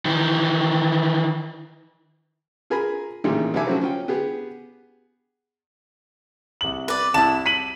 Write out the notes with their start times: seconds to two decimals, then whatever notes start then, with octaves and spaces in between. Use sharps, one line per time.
0.05 D#3 E3
2.70 F4 G#4 A#4 G#5 A#5 B5
3.24 A1 A#2 D#3 D#4 G4 G#4
3.54 C2 D3 D#4 E5 G#5 D6
3.67 F3 F#3 A3 C4 C#4 F#4
3.81 C#4 F4 G5
4.08 B3 G4 G#4
6.61 C2 F#7
6.88 B4 D5
7.14 C2 E4 A5 E7
7.46 B6 D#7 F#7